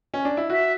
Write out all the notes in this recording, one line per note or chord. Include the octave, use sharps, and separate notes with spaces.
C#4
D4
E4
F#4 E5